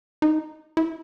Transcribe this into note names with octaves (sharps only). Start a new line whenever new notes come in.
D#4
E4